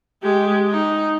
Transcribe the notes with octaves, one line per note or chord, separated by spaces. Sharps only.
G#3 G4
D#4